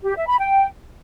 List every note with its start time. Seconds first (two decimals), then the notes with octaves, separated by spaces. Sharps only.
0.04 G4
0.16 E5
0.27 B5
0.39 G5